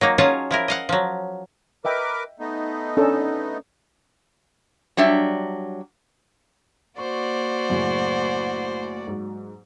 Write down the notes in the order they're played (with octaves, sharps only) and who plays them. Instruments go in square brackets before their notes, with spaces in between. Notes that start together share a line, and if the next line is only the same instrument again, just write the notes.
[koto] F#3 A#3 D#4
F#3 C#4 F4 G#4 C#5 A5
F3 E4 A#4
D#5 F5 F#5
F3 F#3
[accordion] A#4 B4 D6 [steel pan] D#5 E5 G5
[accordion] A3 B3 D#4
[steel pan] C#4 D4 A4
[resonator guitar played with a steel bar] F#3 G3 D4 E5
[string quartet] A#3 F#4 D5 [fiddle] C5 [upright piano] C#6
[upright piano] F#2 A2 C#3
G#2 F#3